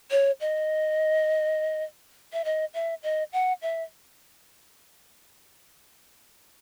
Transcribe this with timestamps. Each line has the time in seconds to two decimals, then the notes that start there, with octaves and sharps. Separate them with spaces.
0.11 C#5
0.40 D#5
2.33 E5
2.45 D#5
2.74 E5
3.03 D#5
3.33 F#5
3.62 E5